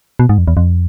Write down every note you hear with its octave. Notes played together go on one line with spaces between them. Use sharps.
B2
G#2
F2
E2
F2